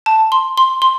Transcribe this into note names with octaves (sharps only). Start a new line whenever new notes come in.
A5
C6
C6
C6